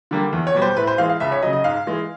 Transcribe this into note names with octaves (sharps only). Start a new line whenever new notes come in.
D3 G3 A#3
E2
C#5
B2 G3
C5
A2 B4
C5
E3 G#3 F5
F5
C#2 E5
C#5
C#3 F#3 D#5
D#5
G#2 F5
E3 G#3